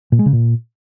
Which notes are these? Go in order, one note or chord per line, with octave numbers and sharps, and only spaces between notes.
A#2
G#3
C#3
A#2